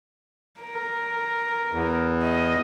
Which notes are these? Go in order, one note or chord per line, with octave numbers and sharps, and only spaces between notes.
A#4
E2
D#5